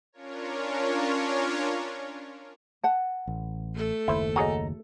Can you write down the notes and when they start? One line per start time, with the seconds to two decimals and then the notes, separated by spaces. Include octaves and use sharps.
0.13 C#4 D4 F4 A#4 C#5
2.84 F#5 A5
3.27 A1
3.74 A3 A4
4.08 F#1 D#2 E4 C5
4.36 F#4 G#4 C#5 D#5 A#5